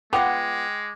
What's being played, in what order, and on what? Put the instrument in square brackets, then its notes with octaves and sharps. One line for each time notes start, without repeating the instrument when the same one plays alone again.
[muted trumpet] G#3 [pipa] B3 F4 F#5 [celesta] G5 [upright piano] D6